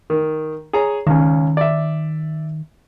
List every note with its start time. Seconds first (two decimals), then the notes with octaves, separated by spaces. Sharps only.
0.10 D#3
0.73 G#4 C#5 A#5
1.07 C#2 D#3 C#4
1.57 D5 E5